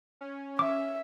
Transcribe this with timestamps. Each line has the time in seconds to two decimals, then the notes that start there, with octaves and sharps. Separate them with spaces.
0.21 C#4
0.59 E5 D6